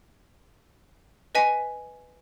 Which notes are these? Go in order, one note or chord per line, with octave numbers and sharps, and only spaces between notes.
B4 D#5 G#5 B6